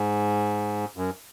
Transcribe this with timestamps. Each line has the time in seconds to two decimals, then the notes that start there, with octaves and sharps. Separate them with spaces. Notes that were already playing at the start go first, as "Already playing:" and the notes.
Already playing: G#2
0.97 F#2